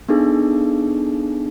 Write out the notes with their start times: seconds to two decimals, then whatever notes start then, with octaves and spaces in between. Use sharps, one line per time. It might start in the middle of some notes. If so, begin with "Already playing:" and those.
0.09 B3 D4 D#4 G#4 A4